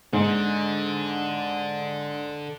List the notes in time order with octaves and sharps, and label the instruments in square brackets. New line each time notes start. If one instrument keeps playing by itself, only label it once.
[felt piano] G#2 [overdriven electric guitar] D3